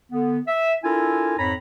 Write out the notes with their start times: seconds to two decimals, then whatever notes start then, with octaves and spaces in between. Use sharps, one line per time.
0.11 D3 B3
0.48 E5
0.84 D4 E4 F4 A4 A#4 G#5
1.38 F2 G#2 C#5 A#5 B5